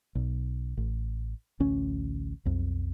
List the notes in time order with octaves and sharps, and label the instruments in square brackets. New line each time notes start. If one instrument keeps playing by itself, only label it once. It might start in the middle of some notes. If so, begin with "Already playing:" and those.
[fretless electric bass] B1
A1
A1 D2 C#4
B1 F2